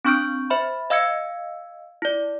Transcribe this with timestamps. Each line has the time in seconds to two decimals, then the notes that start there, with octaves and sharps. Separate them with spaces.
0.05 C4 D4 C#6 F6 G6 D7
0.50 C5 E5 B5
0.90 D#5 F5 E6 G#6 C#7
2.02 E4 D5